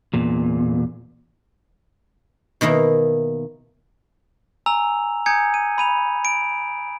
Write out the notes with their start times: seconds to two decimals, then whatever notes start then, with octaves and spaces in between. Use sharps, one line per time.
0.13 E2 A#2
2.61 B2 D#3 A#3 E4
4.66 G#5 A#5 E6 F7
5.26 G#5 A#5 D#6 G6 G#6 C#7
5.54 D#7
5.78 B5 D#7 F7
6.25 D7